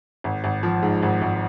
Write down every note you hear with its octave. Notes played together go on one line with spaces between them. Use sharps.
G#1
G#1
F3
G#2
G#1
G#1